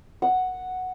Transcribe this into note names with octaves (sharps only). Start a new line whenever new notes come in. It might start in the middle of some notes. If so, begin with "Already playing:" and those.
F#5